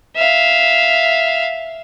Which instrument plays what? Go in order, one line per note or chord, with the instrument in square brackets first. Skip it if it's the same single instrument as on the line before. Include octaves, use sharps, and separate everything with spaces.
[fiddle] E5 F5